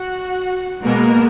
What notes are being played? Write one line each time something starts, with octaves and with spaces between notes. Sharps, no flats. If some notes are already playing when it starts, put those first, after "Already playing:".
Already playing: F#4 F#5
B2 G#3 A#3 B3 A#4